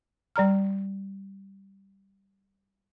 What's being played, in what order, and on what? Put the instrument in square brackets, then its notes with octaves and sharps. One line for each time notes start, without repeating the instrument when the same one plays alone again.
[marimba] G3 D5 A#5 F6